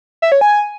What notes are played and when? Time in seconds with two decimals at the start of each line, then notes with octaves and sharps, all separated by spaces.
0.22 E5
0.32 C#5
0.41 G#5